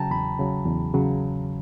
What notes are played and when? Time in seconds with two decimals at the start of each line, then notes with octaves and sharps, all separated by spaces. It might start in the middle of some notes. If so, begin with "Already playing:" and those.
Already playing: C#3 F#3 G5 A5 A#5
0.11 E2 B5
0.39 C#3 F#3
0.66 E2
0.94 C#3 F#3